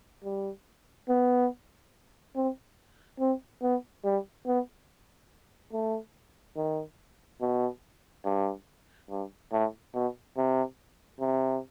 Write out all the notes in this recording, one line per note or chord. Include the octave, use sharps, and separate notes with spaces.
G3
B3
C4
C4
B3
G3
B3
A3
D#3
B2
G2
G2
A2
B2
C3
C3